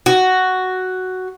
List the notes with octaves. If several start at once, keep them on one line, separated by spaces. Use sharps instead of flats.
F#4